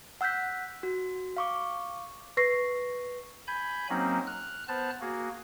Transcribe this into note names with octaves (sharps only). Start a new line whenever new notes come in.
F#5 E6 F#6 G6 B6
F#4
F5 C#6 D6
B4 C#6 A#6 C7
G#5 B5 G6
F#3 A#3 C4 C#4 D#4
F6 F#6
B3 C5 A5 F6 F#6
A#3 F#4 G#4